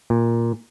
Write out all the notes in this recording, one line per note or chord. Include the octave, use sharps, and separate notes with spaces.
A#2